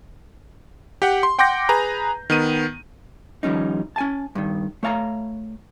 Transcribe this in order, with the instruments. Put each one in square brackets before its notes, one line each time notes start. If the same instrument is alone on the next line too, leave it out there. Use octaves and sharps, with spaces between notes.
[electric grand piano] G4 F#5 G5
C6
F#5 G5 C6 D6 G6 A#6
G#4 B4 A#5
D#3 B3 D#7
[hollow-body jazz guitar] D#3 F3 G3 C#4 D#4
C#4 G#5 A5
G2 D#3
A3 C#5 F5 A5 A#5